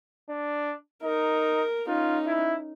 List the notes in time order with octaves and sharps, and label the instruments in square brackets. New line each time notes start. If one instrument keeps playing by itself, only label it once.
[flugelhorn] D4
[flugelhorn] D#4 [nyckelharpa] A#4
[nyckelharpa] C#4 D#4 [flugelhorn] F4
[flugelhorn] E4